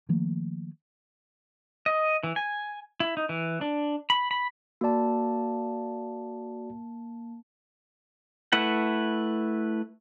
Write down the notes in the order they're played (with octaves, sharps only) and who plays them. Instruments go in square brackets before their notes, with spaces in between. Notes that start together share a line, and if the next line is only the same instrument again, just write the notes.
[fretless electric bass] D#3 F3 A3 A#3
[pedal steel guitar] D#5
E3
G#5
E4
D#4
E3
D4
B5
B5
[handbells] A#3 A5 [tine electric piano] F#4 D5
[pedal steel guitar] A3 E4 B4 F#5